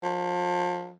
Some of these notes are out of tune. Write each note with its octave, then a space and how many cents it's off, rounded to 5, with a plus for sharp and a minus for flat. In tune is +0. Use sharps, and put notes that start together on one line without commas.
F3 +30